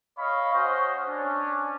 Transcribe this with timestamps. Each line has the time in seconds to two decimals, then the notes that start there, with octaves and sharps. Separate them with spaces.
0.18 C#5 D#5 F5 B5
0.54 C#4 F#4 C5 D#5
1.09 C#4 D4